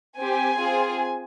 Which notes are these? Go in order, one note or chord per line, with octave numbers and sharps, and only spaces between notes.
C4 G4 G#5
C4 F4 G#4